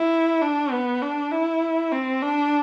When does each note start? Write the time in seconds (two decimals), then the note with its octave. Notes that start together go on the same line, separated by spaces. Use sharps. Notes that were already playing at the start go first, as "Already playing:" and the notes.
Already playing: E4
0.41 D4
0.71 B3
1.01 D4
1.31 E4
1.92 C4
2.22 D4